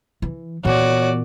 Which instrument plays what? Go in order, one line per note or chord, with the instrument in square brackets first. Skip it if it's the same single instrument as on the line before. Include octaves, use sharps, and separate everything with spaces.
[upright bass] E3
[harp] A#2 [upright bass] E3 B3 [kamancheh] F#4 D5 [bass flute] C#5